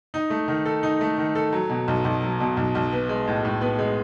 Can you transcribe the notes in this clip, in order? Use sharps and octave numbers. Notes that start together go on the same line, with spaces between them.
D#4
A3
D#3
A4
D#4
A3
D#3
A4
F#3
B2
B1
B1
F#3
B2
B1
B1
B3
G#3
A2
A2
B3
G#3